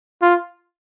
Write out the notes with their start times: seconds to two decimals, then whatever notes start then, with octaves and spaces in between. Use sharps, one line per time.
0.22 F4